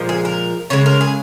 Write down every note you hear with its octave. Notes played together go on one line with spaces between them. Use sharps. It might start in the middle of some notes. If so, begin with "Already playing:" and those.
Already playing: A#2 F3 G#3
G#4
A#4
C#3 G#3 C#5
A#4
G#4